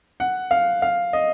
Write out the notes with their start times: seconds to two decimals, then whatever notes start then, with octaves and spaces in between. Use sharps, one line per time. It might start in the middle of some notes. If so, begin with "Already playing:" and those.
0.20 F#5
0.51 F5
0.82 F5
1.13 D#5